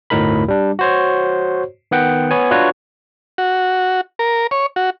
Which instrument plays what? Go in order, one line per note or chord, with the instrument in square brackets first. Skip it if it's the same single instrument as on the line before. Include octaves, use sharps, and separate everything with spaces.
[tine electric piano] G1 D2 A2 D#4 A#4 B5
G3 D4
F#4 C5 C#5
D#3 B3 F#5 G5
B3 C#5 G#5
D4 F4 F#4 B4 C#5
[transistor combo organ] F#4
A#4
C#5
F#4